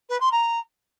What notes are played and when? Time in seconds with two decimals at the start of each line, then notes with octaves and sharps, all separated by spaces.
0.09 B4
0.21 C6
0.32 A#5